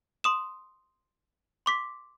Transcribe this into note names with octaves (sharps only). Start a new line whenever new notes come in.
C6 D#6 E7
C6 D6 B6